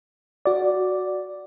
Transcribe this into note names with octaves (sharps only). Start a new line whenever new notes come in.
F#4 D5